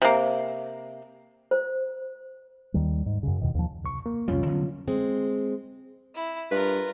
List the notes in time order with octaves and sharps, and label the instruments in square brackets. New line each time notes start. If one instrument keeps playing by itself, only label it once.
[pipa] C3 A#3
[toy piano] C5
[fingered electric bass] D#2 D#3 G3
G#2
F#2 C#3
E2 B2 D#3
D#2 F3
[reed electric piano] C2 C#6
A#3
[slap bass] C2 F2 G3 [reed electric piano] C#4 F4
[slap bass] D3 F#3 B3
[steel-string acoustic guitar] G#3 C4
[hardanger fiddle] E4
[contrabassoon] G2 [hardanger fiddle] F4 A#4 [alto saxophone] B4